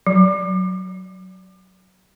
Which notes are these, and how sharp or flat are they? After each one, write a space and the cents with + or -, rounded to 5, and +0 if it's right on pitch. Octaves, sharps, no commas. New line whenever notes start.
F#3 +5